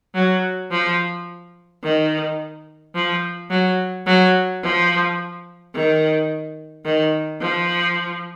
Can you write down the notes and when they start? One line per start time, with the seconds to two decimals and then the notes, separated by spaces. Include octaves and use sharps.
0.15 F#3
0.71 F3
1.84 D#3
2.95 F3
3.50 F#3
4.07 F#3
4.63 F3
5.74 D#3
6.85 D#3
7.41 F3